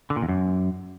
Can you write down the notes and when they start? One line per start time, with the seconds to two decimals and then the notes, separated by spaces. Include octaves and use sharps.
0.10 D3
0.16 A#2
0.22 E2
0.29 F#2